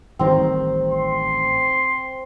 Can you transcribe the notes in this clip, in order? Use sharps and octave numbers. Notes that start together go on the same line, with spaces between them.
A1 D#3 G3 C4 A#5
C6